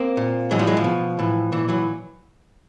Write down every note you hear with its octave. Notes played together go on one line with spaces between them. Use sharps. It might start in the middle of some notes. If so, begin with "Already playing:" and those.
Already playing: A#3 C4
A#2
A2 E3 F#3 G#3
F3 G3
F#3 G#3
F3
B2
A2 E3
A#2 E3
E3 F#3